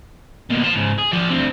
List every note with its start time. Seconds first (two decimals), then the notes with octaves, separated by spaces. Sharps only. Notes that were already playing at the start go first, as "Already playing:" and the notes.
0.50 B2 A#3
0.64 F4 A5
0.75 G#2 C#3
0.99 G#4
1.13 F3 D5
1.30 D2 C4